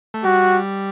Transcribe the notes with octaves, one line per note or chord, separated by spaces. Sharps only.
A3
G3 F#4